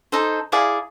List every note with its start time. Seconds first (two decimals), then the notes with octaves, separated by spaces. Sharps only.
0.12 D#4 A4 C5
0.52 E4 G#4 D5 F5